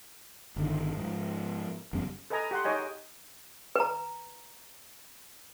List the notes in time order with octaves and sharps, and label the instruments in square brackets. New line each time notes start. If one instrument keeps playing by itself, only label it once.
[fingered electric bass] G1 D3 D#3
G#2 F3
F#1 E2 G3 C#4
[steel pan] A4 B4 D#5 G#5 A#5 D#6
G4 F#5 C6
D#4 G#4 C#5 D#5 G5 G#5
[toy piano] B4 A#5